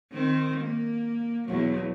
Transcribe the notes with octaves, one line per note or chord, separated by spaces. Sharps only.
D#3 C4
A#3
E2 B2 F#3